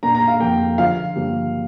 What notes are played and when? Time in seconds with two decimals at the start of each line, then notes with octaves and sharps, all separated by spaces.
0.03 A#2 A#3 D4 A#5
0.15 A#5
0.28 F5
0.40 F2 F3 A#3 G5
0.78 D3 F3 D4 F4 F5
1.16 G2 D3 F3 A#3 G4